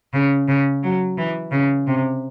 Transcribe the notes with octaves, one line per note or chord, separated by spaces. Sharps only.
C#3
C#3
F#3
E3
C#3
C3